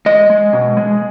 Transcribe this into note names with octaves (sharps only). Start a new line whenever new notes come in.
G#3 D#5
G#3
B2
G#3